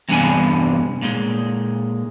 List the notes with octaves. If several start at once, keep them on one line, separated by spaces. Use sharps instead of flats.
E2 G2 C3 B3 D4 G#5
A#2 G#3